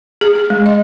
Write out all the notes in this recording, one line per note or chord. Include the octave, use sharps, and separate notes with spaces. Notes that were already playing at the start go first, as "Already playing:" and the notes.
G#4
G#4
G#3
D#5